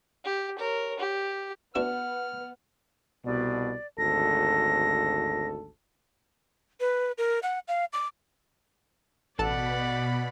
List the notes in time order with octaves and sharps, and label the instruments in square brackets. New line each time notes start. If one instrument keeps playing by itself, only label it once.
[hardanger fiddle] G4
A#4 C#5
G4
[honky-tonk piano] B3 [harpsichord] D4 E4 F#4 [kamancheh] B4 F#5 [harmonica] F6
[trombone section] C2 B2 [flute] D5
[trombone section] G#1 D2 A4 [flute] A#6
[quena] B4
A#4
F#5
F5
D6
[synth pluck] A1 A4 A5 [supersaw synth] B2 B5 [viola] D5 F#5